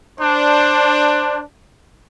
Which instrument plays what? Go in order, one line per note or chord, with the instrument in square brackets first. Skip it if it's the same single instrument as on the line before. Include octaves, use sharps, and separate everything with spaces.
[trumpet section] D4 C5